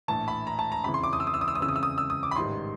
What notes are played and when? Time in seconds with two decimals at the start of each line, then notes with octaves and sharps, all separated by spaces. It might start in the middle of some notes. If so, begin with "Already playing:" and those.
0.08 A#1 A2 E3 A5
0.28 B5
0.47 A#5
0.59 A5
0.72 A#5
0.84 F2 C#3 E3 B5
0.94 C6
1.03 D6
1.13 D#6
1.20 E6
1.27 D#6
1.34 E6
1.41 D#6
1.48 E6
1.55 D#6
1.60 F2 C#3 E3 E6
1.69 D#6
1.76 E6
1.83 D#6
1.98 E6
2.10 D#6
2.23 D6
2.31 B5
2.36 A1 G#2 D#3 G3 C6